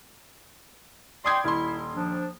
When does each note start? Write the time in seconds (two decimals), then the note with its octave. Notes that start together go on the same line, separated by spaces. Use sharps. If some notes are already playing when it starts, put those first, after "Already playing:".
1.24 D5 G5 C6 D#6 G#6
1.45 D#1 E4 C6
1.96 F3 D4